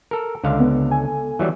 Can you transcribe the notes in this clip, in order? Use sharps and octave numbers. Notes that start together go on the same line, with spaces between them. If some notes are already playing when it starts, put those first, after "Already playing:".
A4 A#4
C#2 D3 F5
B3
A4 G#5
E3 F#3 G3